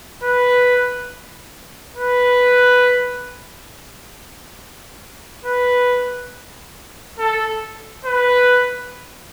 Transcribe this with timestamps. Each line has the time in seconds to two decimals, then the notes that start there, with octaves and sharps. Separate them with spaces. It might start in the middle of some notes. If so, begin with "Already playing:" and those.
0.23 B4
1.97 B4
5.45 B4
7.19 A4
8.06 B4